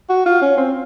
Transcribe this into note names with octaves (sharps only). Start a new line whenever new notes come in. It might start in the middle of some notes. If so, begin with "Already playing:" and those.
F#4
F4
C#4
C4